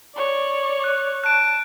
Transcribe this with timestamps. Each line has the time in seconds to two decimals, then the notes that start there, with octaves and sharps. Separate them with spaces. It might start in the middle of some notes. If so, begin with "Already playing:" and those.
0.15 C#5 D5
0.84 F#6
1.24 A5 F#6 D7